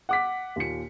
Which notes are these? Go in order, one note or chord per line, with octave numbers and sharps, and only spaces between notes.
F#5 D6 B6
D#2 A#2 C#7